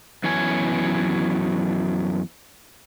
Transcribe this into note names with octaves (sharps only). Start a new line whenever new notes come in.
F#2 E3 B3 C#5 G#5